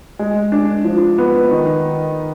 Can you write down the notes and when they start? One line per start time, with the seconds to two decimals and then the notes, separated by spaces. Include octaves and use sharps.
0.19 G#3
0.52 D4
0.85 F3
1.18 B3
1.51 D#3